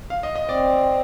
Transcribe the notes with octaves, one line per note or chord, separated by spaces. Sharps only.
F5
D#5
D#5
C4 D5